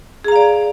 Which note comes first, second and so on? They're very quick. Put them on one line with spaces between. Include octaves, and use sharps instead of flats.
G#4 A#5 F5 D5